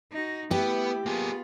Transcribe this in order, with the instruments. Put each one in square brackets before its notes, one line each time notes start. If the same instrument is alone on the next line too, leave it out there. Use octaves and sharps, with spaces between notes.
[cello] D#4 F#4
[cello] A3 E4 [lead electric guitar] B3 [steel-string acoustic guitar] G4
[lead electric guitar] A#3 G#4 [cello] B3 F4